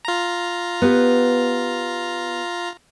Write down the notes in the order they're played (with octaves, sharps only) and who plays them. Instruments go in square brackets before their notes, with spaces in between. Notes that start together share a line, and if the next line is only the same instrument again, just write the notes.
[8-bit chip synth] F4 A#5
[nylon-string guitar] B3 G4 B4